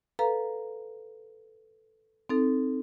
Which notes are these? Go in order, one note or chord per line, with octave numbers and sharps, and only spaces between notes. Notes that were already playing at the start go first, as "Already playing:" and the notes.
A4 B4 F5 A#5
C4 D#4 A4